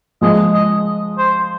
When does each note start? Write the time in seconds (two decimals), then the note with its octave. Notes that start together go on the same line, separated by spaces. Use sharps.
0.21 F3 G#3 D#5
0.54 D#5
1.18 C5